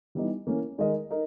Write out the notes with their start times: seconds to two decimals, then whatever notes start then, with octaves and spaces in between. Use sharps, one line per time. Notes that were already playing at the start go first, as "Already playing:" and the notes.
0.15 E3 G3 B3 D#4
0.47 E3 A#3 C#4
0.78 D#3 G#3 D#4 A#4 D#5
1.11 D#4 A#4